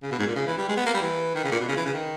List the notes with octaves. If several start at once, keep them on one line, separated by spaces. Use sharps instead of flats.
C#3
B2
G#2
A#2
C#3
E3
G3
G#3
B3
A#3
G3
E3
D#3
C#3
A#2
B2
C#3
E3
C#3
D#3